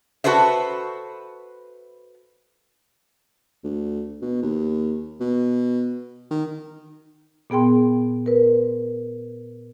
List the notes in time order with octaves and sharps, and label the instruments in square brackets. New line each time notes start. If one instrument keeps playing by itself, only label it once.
[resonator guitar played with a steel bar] F#4 A4 B4 C5 E5
[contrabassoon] D2
B2
D#2
B2
D#3
[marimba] A#2 B3 G#4 G5 C6
A#4 B4